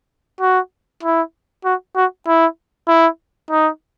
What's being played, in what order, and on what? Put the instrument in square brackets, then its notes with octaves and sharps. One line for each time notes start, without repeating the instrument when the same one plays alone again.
[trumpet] F#4
E4
F#4
F#4
E4
E4
D#4